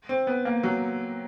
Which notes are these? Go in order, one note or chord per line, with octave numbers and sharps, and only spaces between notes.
C4
B3
A#3
F#3